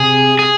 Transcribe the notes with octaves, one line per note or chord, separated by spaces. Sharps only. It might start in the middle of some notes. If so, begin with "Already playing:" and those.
Already playing: C3 G#4
G#4